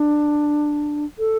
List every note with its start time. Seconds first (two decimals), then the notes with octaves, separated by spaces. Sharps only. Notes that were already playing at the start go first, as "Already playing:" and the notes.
Already playing: D4
1.19 A4